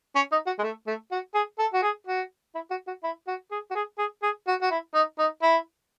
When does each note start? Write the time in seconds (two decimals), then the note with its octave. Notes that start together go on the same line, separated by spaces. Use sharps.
0.15 C#4
0.31 D#4
0.46 F#4
0.58 G#3
0.63 A3
0.87 A3
1.11 F#4
1.34 G#4
1.58 A4
1.73 F#4
1.82 G#4
2.06 F#4
2.55 E4
2.70 F#4
2.87 F#4
3.03 E4
3.27 F#4
3.51 G#4
3.70 F#4
3.75 G#4
3.98 G#4
4.22 G#4
4.47 F#4
4.62 F#4
4.70 E4
4.94 D#4
5.19 D#4
5.42 E4